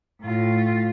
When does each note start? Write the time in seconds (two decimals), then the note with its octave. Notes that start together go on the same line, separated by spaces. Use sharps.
0.22 A2 F4